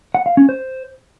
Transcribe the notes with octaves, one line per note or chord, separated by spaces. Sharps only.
F#5
F5
C#4
C5